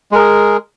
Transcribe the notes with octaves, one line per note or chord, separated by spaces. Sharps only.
G#3 G#4 A#4